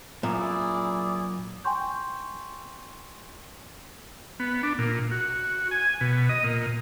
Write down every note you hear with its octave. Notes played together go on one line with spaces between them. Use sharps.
F#2 A#2 E4 G#4 D5
G5 G#5 C6 C#6 G6
B3
D4
A#2
F#4
G#5
B2
D#5
A#2